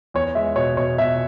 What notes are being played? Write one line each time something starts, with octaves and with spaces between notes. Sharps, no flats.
E2 C#5
G#3 E5
B2 C#5
B2 C#5
B2 E5